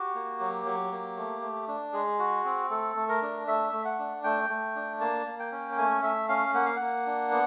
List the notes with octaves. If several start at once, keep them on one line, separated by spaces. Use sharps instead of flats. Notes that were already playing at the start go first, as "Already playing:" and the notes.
Already playing: F#4 G4
A#3
F#3
F#3
A#3
A3
A3
D4
G#3 G#4
F#4
C4
A3 A4
A3
A#4
D4
A3 E5
A3
F#5
D4
A3 G5
A3
D4
A#3 A5
A#3
G5
C#4
G5
A3 G#5
A3 E5
C#4 F5
A#3 F#5
F5
A#3 F#5
D4
B3